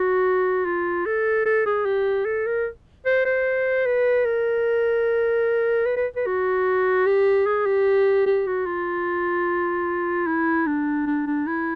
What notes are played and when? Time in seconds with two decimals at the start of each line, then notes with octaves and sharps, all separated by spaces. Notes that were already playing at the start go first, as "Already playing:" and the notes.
Already playing: F#4
0.65 F4
1.06 A4
1.45 A4
1.66 G#4
1.85 G4
2.25 A4
2.46 A#4
3.06 C5
3.25 C5
3.86 B4
4.25 A#4
5.86 B4
5.96 B4
6.16 B4
6.26 F#4
7.06 G4
7.46 G#4
7.66 G4
8.26 G4
8.47 F#4
8.66 F4
10.27 E4
10.66 D4
11.07 D4
11.27 D4
11.47 E4